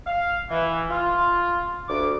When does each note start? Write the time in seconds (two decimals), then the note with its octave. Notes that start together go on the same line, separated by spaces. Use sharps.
0.06 F5
0.50 E3
0.89 F4
1.89 D2 D6